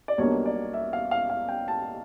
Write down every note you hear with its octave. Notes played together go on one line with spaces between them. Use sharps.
D5
B1 B2 G3 A#3 D4 C#5
D5
E5
F5
F5
F5
G5
A5